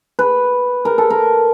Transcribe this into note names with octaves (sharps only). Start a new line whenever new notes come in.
B4
A#4
A4
A#4